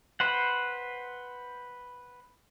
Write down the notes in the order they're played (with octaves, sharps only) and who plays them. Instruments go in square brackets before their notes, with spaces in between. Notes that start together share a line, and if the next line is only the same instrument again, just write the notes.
[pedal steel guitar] B4 C5 F#5